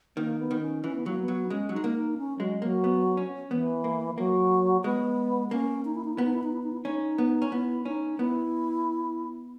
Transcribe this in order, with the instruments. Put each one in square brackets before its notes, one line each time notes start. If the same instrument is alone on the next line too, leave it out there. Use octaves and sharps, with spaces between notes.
[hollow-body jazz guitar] D#3 [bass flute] A#3
[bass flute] B3
[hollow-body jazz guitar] D#3
[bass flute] C#4
[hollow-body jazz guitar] E3 [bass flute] C#4
[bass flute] B3
[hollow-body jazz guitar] F#3 [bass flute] A#3
[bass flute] B3
[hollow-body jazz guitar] F#3
[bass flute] D#4
[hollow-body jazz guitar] G#3 [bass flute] C#4
[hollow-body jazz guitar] F#3
[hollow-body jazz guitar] G#3 [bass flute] D#4
[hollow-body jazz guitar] A#3
[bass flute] D#4
C#4
[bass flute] F#3 [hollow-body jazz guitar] G#3
[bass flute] F#3 [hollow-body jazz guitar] A#3
[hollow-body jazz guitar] B3
C#4
[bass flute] E3 [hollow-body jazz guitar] B3
[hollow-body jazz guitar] A#3
[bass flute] F#3 [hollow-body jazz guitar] A#3
[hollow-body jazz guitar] G#3 [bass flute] B3
[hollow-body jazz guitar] A#3 [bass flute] C#4
[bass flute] D#4
E4
D#4
[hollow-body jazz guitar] B3 [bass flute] E4
[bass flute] D#4
E4
D#4
E4
D#4
E4
[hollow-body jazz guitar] C#4 [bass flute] D#4
[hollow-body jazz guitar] B3
C#4
[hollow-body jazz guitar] B3 [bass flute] E4
[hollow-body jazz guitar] C#4 [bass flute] D#4
[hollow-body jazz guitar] B3 [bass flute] E4